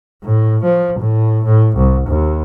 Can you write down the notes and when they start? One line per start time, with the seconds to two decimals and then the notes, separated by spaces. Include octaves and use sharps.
0.23 A2
0.64 F3
0.99 A2
1.45 A2
1.77 C2
2.08 D#2